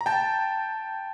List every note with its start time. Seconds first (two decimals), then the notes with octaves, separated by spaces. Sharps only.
0.01 A#5
0.06 G5 A5